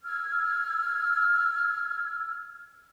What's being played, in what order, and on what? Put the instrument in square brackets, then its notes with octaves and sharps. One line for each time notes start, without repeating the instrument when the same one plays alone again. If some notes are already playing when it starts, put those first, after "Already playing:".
[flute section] E6 F6 G#6